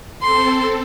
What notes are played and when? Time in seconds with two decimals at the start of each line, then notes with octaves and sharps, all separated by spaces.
0.22 C4 A4 C6